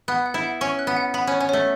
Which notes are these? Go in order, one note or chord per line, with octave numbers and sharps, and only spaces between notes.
B3 F#6
F#5
E4
F#5
C#4 C#6
F#6
B3
F#5
B3 B5
C#4 C#5
C#4
A3 C#5